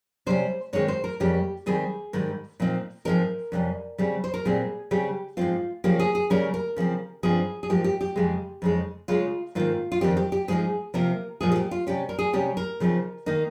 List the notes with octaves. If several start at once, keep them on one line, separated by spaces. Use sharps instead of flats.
C3 G3 C#4 C5
G#2 D#3 G#3 C4 D#4 C#5
C5
A#4
F2 C#3 G3 A#3 C#4 G4
D#2 D#3 G3 C4 G#4
G#2 D#3 G3
A#2 F3 C4 D#4
G#2 F3 G#3 C4 D#4 A#4
F2 C3 G3 C#4
C#3 G3 C4
C5
A#4
A#2 G3 C4 G#4
C#3 G3 C4 G4
G#2 F3 C4 F4
C#3 F3 A#3 C#4 G4
G#4
G#4
C#3 G3 A#3 C#4 A#4
A#4
C#3 F3 C4
G2 F3 C4 D#4 G#4
G#4
G#2 F3 A#3 D#4 G4
G4
G4
F2 C#3 G#3
F2 C#3 G#3 D#4
C#3 G#3 C#4 F4
G#2 D#3 A#3 F4
F4
F2 D#3 G3 C4 G4
G4
G4
G#2 F3 G#3 C4 D#4 G#4
C3 F3 A#3 A#4
A#2 F3 G#3 G#4
G#4
G4
F4
C3 G3 C#4 G4
A#4
G#4
C3 G3 C#4 G4
A#4
C#3 F3 C4 D#4
D#3 A#3 D#4